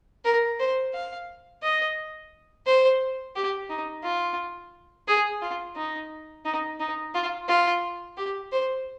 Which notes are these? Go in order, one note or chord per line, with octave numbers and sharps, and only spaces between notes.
A#4
C5
F5
D#5
C5
G4
D#4
F4
G#4
F4
D#4
D#4
D#4
F4
F4
G4
C5